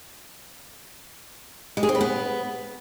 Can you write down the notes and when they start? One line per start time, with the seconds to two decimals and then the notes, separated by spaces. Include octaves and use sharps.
1.77 G#3
1.83 G#4
1.89 C4
1.95 B4
2.01 B3